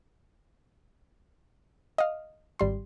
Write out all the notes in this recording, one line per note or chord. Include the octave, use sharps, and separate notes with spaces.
D#5 F5
G#1 G3 C6